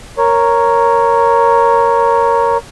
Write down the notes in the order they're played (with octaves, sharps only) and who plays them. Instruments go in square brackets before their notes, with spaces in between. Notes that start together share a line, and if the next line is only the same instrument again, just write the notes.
[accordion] A#4 C#5